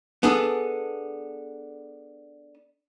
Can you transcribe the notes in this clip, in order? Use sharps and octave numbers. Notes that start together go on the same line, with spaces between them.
B3 D4 G#4 A4